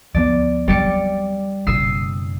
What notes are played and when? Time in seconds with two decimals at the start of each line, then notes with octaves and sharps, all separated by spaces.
0.14 D2 F3 B3 D5
0.68 F#3 G3 C4 D5 C#7
1.67 F#1 B2 D#6 E6 C7